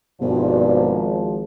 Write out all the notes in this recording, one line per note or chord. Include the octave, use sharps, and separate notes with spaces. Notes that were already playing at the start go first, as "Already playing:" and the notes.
G#1 G2 B2 F3